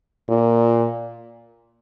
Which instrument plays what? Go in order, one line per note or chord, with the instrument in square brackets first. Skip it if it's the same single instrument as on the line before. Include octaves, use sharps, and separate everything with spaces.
[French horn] A#2